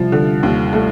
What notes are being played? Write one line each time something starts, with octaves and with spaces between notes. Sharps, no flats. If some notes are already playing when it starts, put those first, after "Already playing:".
Already playing: C2 C3 F3
D3
D#2
A3